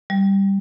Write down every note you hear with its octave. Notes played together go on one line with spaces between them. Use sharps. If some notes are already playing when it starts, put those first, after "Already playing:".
G3